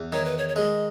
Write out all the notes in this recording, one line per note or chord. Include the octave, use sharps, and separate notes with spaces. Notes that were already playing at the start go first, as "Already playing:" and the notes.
Already playing: E2
D#3 C#5
B4
C#5
C#5
G#3 D#5